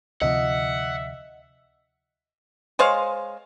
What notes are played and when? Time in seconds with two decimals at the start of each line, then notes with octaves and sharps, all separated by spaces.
0.22 D2 C3 F3 D#5 E5 F#5
2.79 G#3 C5 C#5 F5